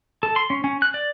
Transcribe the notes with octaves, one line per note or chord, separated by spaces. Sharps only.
A4
C6
C#4
C#4
F#6
D5